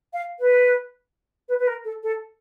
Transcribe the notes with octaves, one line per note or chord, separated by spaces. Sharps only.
F5
B4
B4
B4
A#4
A4
A4